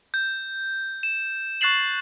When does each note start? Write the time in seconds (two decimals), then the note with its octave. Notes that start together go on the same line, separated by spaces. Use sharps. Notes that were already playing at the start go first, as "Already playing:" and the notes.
0.14 G6
1.03 E7
1.61 C#6 F#6 A6 C7 E7 F#7